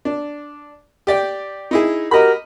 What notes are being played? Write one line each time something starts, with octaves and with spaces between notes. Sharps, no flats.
D4
G4 D5 G5
D#4 E4 G#4
F#4 G4 A#4 D#5 B5